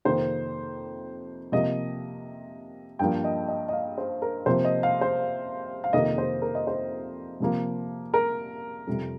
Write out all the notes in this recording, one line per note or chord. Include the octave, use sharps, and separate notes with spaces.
F2 C3 D#3 A#3 C5
C3 F3 A#3 D#5
G2 F3 A#3 G5
D#5
D#5
D#5
F5
C5
A#4
C3 F3 A#3 C5
D#5
F5
C5
F5
F2 C3 D#3 A#3 D#5
C5
A#4
D#5
C5
C3 F3 A#3
A#4
F2 C3 G3